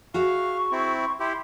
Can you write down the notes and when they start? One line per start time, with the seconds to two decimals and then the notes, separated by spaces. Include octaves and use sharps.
0.14 F#4 G#4 E5 F5 C#6
0.72 C4 E4
1.20 E4 G4 C6